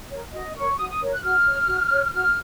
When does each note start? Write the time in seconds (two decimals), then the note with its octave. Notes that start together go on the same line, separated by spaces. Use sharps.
0.11 A#4 C#5
0.33 F#4 D#5
0.55 A#4 C#5 C#6
0.78 F#4 D#6
0.89 D#6
1.01 A#4 C#5
1.12 F#6
1.23 F#4 F6
1.46 C#5
1.67 F#4
1.91 C#5
2.13 F#4 F6